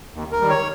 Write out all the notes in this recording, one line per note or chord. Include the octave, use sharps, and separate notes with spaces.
D#2
A#4
D#3 G3
C#5